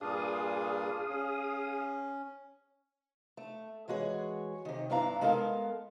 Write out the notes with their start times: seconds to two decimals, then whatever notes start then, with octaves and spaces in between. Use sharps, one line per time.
0.01 G2 A#2 D4 G#4 F5 D#6
1.10 C#4
3.37 A3
3.88 E3 G#3 F#4 G#4 C#5
4.65 C3 D#3
4.90 G2 B3 D4 E4 F5 A#5
5.21 G#3 B3 A4 A#4 F5